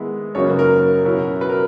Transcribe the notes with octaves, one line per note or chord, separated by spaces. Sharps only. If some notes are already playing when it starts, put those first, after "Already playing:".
Already playing: D#3 G#3 B3 E4
F#2 C#3 F#3 A#3 D#4 C#5
B4
A#4
B2 F#3 C#4 E4
B4
A#4